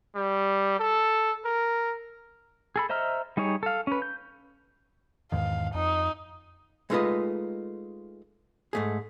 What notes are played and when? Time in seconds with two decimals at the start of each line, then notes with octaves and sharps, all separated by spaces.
0.15 G3
0.79 A4
1.45 A#4
2.76 G#4 A4 B5
2.90 C5 D#5 E5 A#5 F6
3.37 G3 D#4 G#4 C#5
3.63 A4 F5
3.87 C#4 B4
4.02 G6
5.32 E2 G#2 D#3 F5
5.74 F2 D#4
6.90 G#3 A3 D#4 F4 B4 D#5
8.73 G#2 A3 G#4